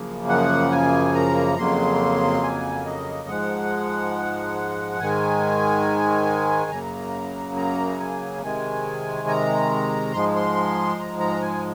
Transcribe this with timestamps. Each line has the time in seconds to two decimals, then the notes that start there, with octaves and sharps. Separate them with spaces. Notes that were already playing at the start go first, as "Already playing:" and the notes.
Already playing: F#2 C#3 F3 A#3
0.29 F#5
0.72 G#5
1.15 A#5
1.58 F2 C#3 F#3 A#3 C6
2.43 G#5
2.86 D#5
3.29 G#2 F3 G#3 F#5
4.99 G#2 D#3 G#3 G#5
6.71 F#2 C#3 F#3 A#3 A#5
7.57 A#5
8.00 G#5
8.42 C3 D#3 G#3 G#5
9.28 A#5
10.13 G#2 F3 G#3 C6
10.36 C6
10.99 A#5
11.19 A#5
11.42 G#5